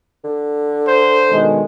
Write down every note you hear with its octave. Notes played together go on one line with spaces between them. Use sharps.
D3
C5
B2 D#3 G#3